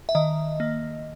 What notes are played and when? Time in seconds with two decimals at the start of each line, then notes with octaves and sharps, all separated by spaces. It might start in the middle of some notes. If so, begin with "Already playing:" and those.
0.09 E5
0.15 D#3 D#5
0.60 A#3